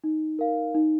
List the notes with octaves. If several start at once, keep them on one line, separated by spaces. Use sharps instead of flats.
D#4
A#4 F5
D#4